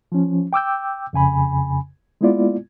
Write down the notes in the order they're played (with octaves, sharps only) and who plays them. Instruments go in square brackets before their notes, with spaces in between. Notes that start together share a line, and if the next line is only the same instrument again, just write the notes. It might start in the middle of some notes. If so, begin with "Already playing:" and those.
[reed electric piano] F3 C#4
G5 D6 E6 G6
F2 C#3 G#5 B5
G#3 A#3 B3 E4 F4 D5